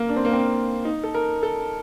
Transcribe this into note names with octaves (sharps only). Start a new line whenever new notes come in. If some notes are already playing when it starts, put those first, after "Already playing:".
Already playing: A#3
D4
C4
A#3
C4
D#4
A4
A#4
A4